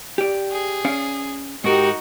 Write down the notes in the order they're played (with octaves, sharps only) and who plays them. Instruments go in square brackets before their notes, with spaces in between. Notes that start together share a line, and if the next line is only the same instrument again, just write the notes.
[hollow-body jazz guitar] G4 D5
[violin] G#4
[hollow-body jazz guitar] C#4 D5 F5
[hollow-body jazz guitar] G#2 A#4 [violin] D#4 F#4 [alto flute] G4